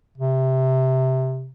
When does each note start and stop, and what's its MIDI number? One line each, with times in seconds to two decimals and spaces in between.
0.18 1.51 48